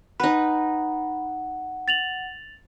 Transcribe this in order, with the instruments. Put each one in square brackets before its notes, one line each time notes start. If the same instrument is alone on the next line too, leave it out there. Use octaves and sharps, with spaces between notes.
[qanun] D#4 B4 [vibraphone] F#5 [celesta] B5
[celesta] A6 F7 F#7